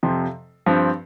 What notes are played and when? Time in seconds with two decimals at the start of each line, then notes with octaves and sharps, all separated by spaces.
0.03 F2 C3 F3
0.66 G2 F3 C4